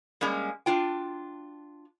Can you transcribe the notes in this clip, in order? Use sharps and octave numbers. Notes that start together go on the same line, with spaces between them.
G3 G#3 A#3 C#4
D4 F4 G5